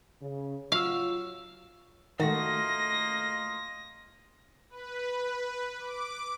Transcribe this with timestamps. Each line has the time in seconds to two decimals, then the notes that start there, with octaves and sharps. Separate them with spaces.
0.22 C#3
0.72 F#3 F4 F5 C#6 E6
2.20 D#3 A3 A#3 F4 F#4 D#5 A#6
4.70 B4
5.78 D6